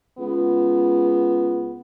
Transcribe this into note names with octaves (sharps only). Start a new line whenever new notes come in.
C#2 B3